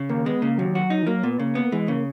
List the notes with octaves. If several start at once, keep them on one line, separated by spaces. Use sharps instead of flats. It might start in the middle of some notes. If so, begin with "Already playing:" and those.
Already playing: C#3
D#2 A#3
G#3 B3
C#3 A#3
D#2 F#3
F#4
D#4
E3
F#3 A#3
A#2 B3
C#3 A#3
B3
E3 G#3
C#3 A#3